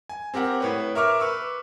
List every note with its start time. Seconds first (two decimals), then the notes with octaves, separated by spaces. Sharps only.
0.09 G#5
0.34 C4 G4 A#4 F#5
0.60 A2 B4 C#5
0.95 A#4 E5 C#6 D6 F6
1.20 B4 C#6 D6 E6